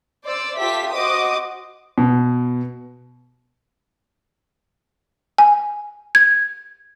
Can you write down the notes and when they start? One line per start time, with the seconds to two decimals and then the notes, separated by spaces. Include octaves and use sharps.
0.24 C5 D5 E6
0.58 F4 G4 A4 E5 B6
0.93 F#4 C5 D#5 D6 D#6
1.98 B2
5.38 G#5
6.15 G#6